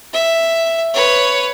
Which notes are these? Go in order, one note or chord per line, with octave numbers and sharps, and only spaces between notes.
E5
B4 C#5